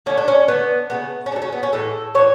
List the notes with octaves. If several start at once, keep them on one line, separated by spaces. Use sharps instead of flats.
D3 A3 C#4
D4
C#4
D3 A3 B3
C#3 F#3 A3 B3
C#4
C#3 F#3 A3 D4
C#4
B3
C#4
A2 E3 G#3 A4
A2 E3 C#5